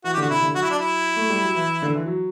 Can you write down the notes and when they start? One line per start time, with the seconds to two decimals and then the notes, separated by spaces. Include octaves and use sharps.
0.04 E3 F#4
0.14 G4
0.17 D3 F#4
0.30 C3 E4
0.42 D3
0.55 F#3 F#4
0.62 E4
0.71 D4
0.78 E4
1.16 A3
1.29 G3
1.42 F#3
1.55 E3
1.82 D3
1.95 E3
2.06 F#3